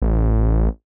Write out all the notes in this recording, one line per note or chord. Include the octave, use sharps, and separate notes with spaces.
A1